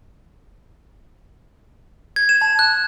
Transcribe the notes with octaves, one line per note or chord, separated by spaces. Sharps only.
G#6
E7
A5
F#6